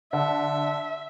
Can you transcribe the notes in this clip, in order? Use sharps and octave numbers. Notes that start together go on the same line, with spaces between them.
D3 E5